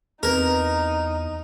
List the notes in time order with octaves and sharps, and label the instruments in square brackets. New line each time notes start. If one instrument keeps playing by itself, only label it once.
[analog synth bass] E2 [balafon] C4 B4 [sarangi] D#4 [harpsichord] A#4